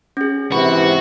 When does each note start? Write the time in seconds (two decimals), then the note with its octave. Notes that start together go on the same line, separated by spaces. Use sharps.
0.17 C#4 G#4
0.52 G#2 C3 E3 F#4 B4 B5